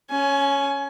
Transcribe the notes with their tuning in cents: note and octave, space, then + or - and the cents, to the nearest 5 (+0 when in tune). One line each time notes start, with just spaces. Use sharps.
C#4 +0 G#5 +25